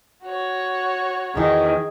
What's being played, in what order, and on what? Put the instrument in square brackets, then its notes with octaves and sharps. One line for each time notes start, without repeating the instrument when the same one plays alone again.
[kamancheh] F#4 C#5
[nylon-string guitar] E2 E3 [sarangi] D#3 [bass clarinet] G#4